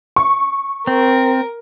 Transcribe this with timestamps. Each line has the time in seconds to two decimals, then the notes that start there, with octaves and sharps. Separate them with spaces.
0.16 C#6
0.87 C4 A#4